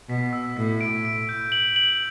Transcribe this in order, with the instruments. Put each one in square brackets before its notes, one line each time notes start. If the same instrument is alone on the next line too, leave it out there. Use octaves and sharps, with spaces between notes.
[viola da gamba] B2 [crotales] B6
[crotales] E6
[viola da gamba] A2 [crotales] B6
[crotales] D7
D7
G6
F#7
F#7